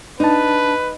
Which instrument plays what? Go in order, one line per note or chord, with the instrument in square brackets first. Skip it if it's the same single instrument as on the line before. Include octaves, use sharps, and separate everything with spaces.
[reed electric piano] D4 A5 [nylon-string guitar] D#4 [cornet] B4